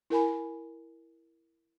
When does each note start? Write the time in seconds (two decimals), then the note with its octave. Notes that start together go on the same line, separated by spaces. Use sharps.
0.10 E4 A#4 G#5 B5